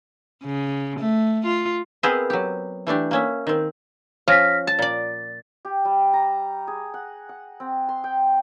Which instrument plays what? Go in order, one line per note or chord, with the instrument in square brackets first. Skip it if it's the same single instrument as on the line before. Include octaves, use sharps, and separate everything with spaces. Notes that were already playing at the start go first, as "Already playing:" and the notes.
[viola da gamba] C#3
A3
F4
[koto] B3 C4 G#4 A#4 C5 E5
F#3 G4
E3 A3 D4 G4
A#3 C#4 E5
D#3 C4
[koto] F3 C#4 F4 [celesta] F6 A#6 B6
[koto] A5 [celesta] A6
[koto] A#2 D5
[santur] G4
G3
A#5
G#4
F#5
F#5
C4
C6
G5